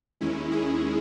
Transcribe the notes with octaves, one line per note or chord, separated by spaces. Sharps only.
D#2 D#3 G#3 C#4 E4
E4 G#4